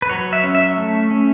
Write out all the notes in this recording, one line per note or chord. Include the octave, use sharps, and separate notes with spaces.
B4
F#3 C#5
E5
C#4
E5
A3
C#4